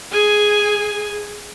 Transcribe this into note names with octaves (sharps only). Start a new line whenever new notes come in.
G#4 G#5